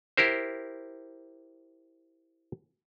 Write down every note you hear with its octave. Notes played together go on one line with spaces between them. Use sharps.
E4 G4 A#4 C5